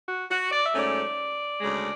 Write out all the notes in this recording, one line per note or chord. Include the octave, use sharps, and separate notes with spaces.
F#4
F#4
D5
E5
G#2 F#3 A3 C#4
D5
D2 C#3 G#3